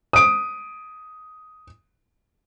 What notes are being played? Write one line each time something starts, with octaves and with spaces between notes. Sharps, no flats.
D#6 D7